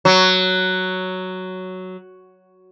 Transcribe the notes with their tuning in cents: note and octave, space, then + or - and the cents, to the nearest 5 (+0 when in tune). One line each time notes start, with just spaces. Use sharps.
F#3 +5